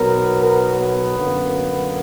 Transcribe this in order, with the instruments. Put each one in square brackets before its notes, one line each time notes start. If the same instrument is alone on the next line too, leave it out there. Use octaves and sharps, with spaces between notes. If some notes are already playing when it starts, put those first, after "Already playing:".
Already playing: [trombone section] B1 B2 F#3 B3 A#4
A#4
B3
F#2 D3 A#3